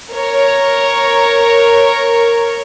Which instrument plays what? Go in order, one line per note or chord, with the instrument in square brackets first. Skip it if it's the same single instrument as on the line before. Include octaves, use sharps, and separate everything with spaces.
[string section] A#4 C#5